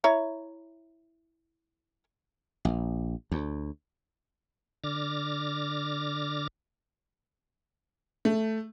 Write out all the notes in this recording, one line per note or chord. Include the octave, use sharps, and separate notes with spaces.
E4 C#5 A#5
A#1
D2
D3 D6 F6 A6 A#6
A3